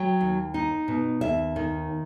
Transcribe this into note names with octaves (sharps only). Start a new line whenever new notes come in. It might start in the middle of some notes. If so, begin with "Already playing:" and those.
Already playing: F#3 G5
D#2
D#4
B2
D#2 E5
D#3